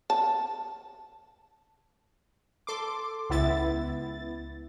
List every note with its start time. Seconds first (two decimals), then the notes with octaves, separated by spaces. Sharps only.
0.10 A5
2.67 A4 C6 D6
3.30 C#2 B3 E4 A6